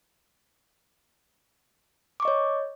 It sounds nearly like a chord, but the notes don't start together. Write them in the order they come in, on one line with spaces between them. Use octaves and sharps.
D6 C#6 D#5 C#5